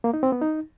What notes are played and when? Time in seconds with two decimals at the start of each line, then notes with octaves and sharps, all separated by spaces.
0.04 A#3
0.14 D#4
0.23 C4
0.32 B3
0.42 D#4